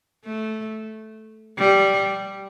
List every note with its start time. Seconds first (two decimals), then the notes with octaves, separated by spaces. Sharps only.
0.25 A3
1.58 G3